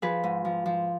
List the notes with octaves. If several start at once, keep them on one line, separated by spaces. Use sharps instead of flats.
F3 G#4 B4
G#2
F3
F3